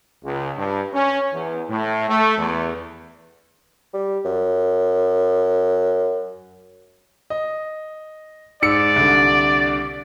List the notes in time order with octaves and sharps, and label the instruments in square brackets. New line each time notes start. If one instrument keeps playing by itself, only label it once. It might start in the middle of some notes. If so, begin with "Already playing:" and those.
[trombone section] C#2
G2
C#4
E2
A2
A3
E2
[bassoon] G3
F#2
[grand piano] D#5
[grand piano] G#2 E6 C#7 [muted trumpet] D5
[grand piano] C2 D3